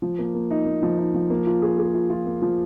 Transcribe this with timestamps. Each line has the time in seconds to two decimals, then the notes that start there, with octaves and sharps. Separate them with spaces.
0.02 F3
0.19 A#3
0.35 A#3
0.51 D#4
0.66 A#3
0.82 F3
0.98 D#4
1.14 F3
1.30 A#3
1.47 F4
1.62 G#4
1.78 G#4
1.94 F4
2.10 F4
2.26 A#3
2.42 F3